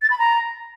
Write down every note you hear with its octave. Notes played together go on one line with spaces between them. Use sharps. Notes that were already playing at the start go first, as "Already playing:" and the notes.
A6
B5
A#5